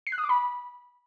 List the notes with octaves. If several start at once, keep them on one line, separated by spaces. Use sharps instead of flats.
C7
F#6
D#6
D6
B5